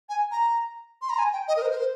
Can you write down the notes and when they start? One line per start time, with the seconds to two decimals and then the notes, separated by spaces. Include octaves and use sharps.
0.09 G#5
0.31 A#5
1.02 C6
1.10 A#5
1.19 G#5
1.33 G5
1.48 D#5
1.57 A#4
1.62 C5
1.71 A#4
1.77 C5